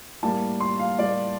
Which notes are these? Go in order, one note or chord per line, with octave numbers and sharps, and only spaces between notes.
A2 G3 A#3 A5
C6
F5
A2 G3 A#3 D5